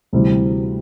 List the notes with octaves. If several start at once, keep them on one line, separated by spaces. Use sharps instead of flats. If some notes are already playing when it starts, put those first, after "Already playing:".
D2 C3 E3 G3 C4